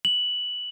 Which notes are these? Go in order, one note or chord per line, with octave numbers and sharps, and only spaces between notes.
F#7